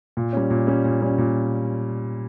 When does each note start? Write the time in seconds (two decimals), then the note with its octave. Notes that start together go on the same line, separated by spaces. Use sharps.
0.17 A#2
0.33 G3 C#4
0.50 A#2
0.67 G3 C#4
0.85 A#2
1.02 G3 C#4
1.18 A#2